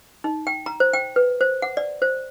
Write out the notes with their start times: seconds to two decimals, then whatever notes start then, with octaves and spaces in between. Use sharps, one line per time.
0.24 D#4
0.47 G5
0.66 A#5
0.80 C5
0.94 G5
1.16 B4
1.41 C5
1.62 F#5
1.77 D5
2.02 C5